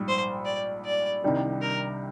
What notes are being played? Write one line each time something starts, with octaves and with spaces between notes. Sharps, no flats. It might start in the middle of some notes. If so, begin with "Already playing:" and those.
Already playing: A#1 G#2 G3
C5
D5
D5
C2 C3 D#3 G3 D4
A#4